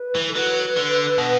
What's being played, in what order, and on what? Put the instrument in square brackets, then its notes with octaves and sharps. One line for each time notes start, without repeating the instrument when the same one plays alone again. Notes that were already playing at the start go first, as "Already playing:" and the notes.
Already playing: [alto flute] B4
[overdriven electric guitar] E3
[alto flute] A4
[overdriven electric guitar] F#3 [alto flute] B4
[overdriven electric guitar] D3
B2